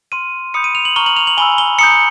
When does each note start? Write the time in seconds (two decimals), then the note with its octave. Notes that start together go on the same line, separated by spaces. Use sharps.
0.12 C6 F6 D#7
0.54 B5 D#6 G6 C#7
0.64 D#7
0.75 F7
0.85 F#7
0.96 A#5 C#6 F6 G7
1.06 F#7
1.16 F7
1.27 F#7
1.37 G#5 B5 E6 G7
1.58 G7
1.79 A#5 D#6 G6 C#7